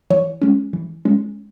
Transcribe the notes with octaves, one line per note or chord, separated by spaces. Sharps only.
E3 C#5
G#3 C#4
E3
G#3 C#4